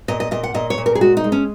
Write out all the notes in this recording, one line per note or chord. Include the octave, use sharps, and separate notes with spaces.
A#2 D#5
D#5
A#2 D#5
F#5
A#2 D#5
C#5
A#2
A#4
G#4
G#3 F#4
D#4
G#3
C#4